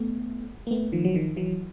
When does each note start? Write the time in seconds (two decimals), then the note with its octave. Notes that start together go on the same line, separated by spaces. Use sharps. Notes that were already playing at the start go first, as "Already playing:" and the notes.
Already playing: A3 B3
0.67 A#3
0.71 A3 B3
0.92 D#3 F3
1.05 F#3
1.14 D#3 F3
1.36 E3 F#3